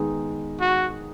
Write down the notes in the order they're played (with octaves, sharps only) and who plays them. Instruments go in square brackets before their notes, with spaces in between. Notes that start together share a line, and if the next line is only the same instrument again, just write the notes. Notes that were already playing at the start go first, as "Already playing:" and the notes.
Already playing: [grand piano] D#3 G#3 B3 D#4 G#4
[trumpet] F#4